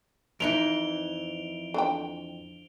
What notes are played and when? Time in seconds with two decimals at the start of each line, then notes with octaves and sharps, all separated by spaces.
0.40 F2 E3 D#4 D7 F7 G7
1.74 D3 F3 G5